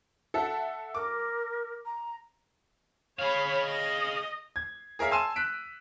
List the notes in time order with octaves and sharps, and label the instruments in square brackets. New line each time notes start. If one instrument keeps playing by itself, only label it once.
[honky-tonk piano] A4 E5 F#5
[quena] A#4 [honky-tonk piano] D6
[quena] A#5
[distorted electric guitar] G#4 F5 [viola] C#5 B5
[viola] D#5
[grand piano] G#6
G#4 A#4 C#5 E5 F5
G#5 A5 C6 E6 D#7 E7
F#6 B6 D7